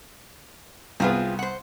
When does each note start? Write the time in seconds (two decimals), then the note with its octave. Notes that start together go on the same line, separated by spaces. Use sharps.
1.00 C2 B3 C4 F4 G#4
1.39 C5 F#5